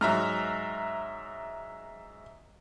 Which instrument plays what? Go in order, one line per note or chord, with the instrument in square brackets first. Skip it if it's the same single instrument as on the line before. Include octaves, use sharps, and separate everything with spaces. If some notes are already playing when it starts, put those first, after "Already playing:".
[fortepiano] G#2 F#3 [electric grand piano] E5 A#5 F6